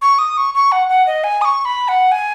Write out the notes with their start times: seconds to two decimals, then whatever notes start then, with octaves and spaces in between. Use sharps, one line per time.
0.02 C#6
0.19 D#6
0.37 C#6
0.54 C#6
0.72 F#5
0.89 F#5
1.07 D#5
1.24 G#5
1.41 D#6
1.45 C#6
1.65 B5
1.88 F#5
2.12 G#5